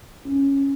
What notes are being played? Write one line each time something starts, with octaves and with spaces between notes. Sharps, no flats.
C#4